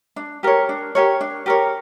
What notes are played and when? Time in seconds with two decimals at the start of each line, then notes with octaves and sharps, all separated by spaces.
0.16 D4
0.43 G4 A#4 C#5
0.69 D4
0.95 G4 A#4 C#5
1.21 D4
1.46 G4 A#4 C#5